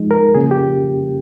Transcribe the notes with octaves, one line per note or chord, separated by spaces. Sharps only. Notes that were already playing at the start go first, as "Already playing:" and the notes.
Already playing: F3 G#3 D#4
A#4
C#3 F3 A#3 C#4 G#4
G4